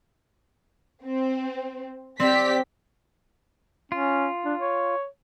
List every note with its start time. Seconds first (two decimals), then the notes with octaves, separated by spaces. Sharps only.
1.04 C4
2.20 C4 G4 D5 B6
3.92 C#4 F4
4.45 D4
4.59 C#5